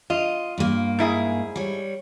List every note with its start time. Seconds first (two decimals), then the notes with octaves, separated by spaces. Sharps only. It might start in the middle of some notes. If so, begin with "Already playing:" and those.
0.10 F4 D#5
0.58 G2 A#3
0.99 G#2 E4 G#4
1.56 G3 C#5